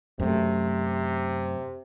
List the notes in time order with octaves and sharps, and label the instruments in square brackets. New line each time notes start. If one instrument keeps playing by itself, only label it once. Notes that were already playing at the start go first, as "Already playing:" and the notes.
[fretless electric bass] F#2 A3 [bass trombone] C3